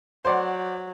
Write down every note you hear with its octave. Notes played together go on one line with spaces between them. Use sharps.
F#3 C5 D5 F#5